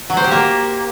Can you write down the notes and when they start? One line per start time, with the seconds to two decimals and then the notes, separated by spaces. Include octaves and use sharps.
0.10 F#3
0.17 C5
0.24 G4
0.31 A#3